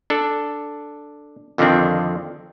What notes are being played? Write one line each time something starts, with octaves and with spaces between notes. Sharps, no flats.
D4 A4
F2 D3 D#3 F3 C4 D4